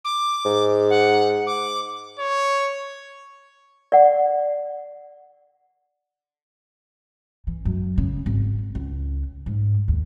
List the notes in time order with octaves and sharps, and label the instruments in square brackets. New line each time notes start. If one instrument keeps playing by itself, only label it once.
[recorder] D6
[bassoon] G#2
[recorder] F#5
D6
[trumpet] C#5
[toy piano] D5 F#5
[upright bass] E3
F#2
C#3
G#1
C#2
G#2
D#2